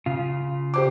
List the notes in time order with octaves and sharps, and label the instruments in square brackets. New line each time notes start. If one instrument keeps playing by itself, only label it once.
[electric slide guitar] C#3 F4
[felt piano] G4 C5 D6